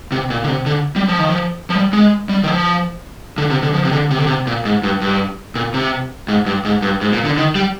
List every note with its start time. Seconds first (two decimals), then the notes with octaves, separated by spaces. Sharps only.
0.12 C3
0.30 A#2
0.44 D3
0.48 C3
0.66 D3
0.96 G3
1.08 F3
1.19 D#3
1.29 F3
1.70 F3
1.75 G3
1.93 G#3
2.29 G3
2.43 D#3
2.48 F3
3.38 D3
3.50 C3
3.62 D3
3.74 F3
3.85 C3
3.92 D3
4.11 C3
4.18 D3
4.27 C3
4.47 A#2
4.65 G#2
4.83 G2
5.01 G2
5.55 A#2
5.74 C3
6.28 G#2
6.46 G2
6.65 G#2
6.82 G2
7.01 G#2
7.13 A#2
7.25 D3
7.37 D#3
7.55 G3